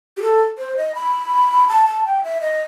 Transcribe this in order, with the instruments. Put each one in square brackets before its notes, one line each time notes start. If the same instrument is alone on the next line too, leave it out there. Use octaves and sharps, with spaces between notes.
[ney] G4
A4
C5
D#5
B5
A5
A5
G5
E5
D#5